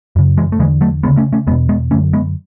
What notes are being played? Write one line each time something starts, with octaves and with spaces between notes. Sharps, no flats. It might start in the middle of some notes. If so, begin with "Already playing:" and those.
F#2 C#3
E3 G#3
A3
E2 D3 E3 G#3
F#3 A3
D2 C#3 G#3 B3
A3 C#4
A3 C#4
E2 B2 G#3 B3
G#3 B3
F#2 D3 A3 C#4
G#3 B3